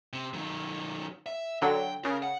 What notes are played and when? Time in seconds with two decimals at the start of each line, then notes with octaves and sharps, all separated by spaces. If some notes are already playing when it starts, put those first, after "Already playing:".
0.13 C3
0.34 D#3 F#3
1.26 E5
1.62 D3 F#3 G5
2.05 C#3 A#4
2.22 F#5